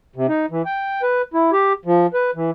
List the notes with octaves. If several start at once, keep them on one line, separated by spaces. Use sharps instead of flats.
C3
D#4
E3
G5
B4
E4
G4
F3
B4
E3